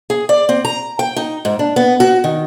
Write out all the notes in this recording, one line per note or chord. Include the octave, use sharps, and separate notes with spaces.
G#4
D5
C4
A#5
G5
D#4
G#2
D4
B3
F#4
D#3